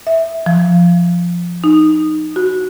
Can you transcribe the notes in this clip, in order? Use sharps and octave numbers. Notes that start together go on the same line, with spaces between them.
E5
F3
D#4
F#4